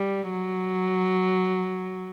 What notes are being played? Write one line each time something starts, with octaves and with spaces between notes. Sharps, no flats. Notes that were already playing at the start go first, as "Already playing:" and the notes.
Already playing: G3
F#3